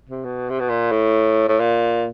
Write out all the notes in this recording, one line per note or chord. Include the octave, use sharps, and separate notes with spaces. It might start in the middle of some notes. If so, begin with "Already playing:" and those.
C3
B2
C3
B2
A#2
A2
A2
A#2